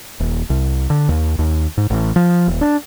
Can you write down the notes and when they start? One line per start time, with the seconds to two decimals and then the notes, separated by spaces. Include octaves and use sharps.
0.20 D#1
0.50 C2
0.90 D3
1.09 D#2
1.39 D#2
1.77 G#2
1.90 A1
2.16 F3
2.48 D#1
2.61 D4